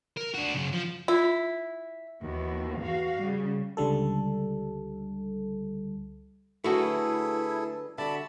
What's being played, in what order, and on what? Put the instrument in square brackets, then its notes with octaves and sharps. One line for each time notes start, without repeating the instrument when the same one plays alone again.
[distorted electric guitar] A#4
D4 F#4
F#2 C#3
F3
[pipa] E4 [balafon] F4
[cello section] D#2 E3 B3 F#4
E2 F#4 F5
C#3 G3
[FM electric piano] C#2 D3 G3 A4
[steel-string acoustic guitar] D3 F#3 B4 [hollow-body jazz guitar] A3 F#4 [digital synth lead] E4 [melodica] G#4 A4
[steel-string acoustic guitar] D3 F#4 [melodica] D5 A5 B5 [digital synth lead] E5